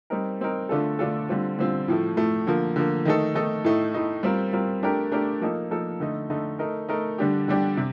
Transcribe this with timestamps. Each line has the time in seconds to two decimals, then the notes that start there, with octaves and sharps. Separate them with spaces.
0.10 G3 C4 D#4 A#4
0.40 G3 C4 D#4 A#4
0.69 D3 A3 D4 F4 A4
0.99 D3 A3 D4 F4 A4
1.29 D3 G3 C4 F4
1.59 D3 G3 C4 F4
1.88 A2 F3 A3
2.17 A2 F3 A3
2.47 D3 F3 A#3
2.76 D3 F3 A#3
3.05 D#3 A3 D#4 A4
3.35 D#3 A3 D#4 A4
3.64 A2 A3 D#4
3.94 A2 A3 D#4
4.23 G3 C4 F4 A#4
4.53 G3 C4 F4 A#4
4.83 A3 D4 G4 A#4
5.11 A3 D4 G4 A#4
5.41 F3 A#3 D#4 A4
5.71 F3 A#3 D#4 A4
6.00 D3 A3 D#4
6.30 D3 A3 D#4
6.59 A3 D#4 A#4
6.89 A3 D#4 A#4
7.18 D3 G3 D4 G4
7.48 D3 G3 D4 G4
7.77 C3